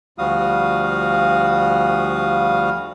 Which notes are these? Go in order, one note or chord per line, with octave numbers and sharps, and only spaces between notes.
D2 F3 G3 F#4 F5 D#6